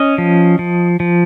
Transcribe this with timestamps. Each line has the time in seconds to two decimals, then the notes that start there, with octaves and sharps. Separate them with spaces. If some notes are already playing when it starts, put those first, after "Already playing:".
Already playing: C#4 D#5
0.18 F3
0.59 F3
1.00 F3